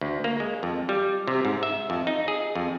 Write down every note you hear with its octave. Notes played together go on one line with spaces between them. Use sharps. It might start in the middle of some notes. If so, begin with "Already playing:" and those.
D2
A#3
G#3
F2
G3
C3
G#2
E5
F2
D#4
G#4
F2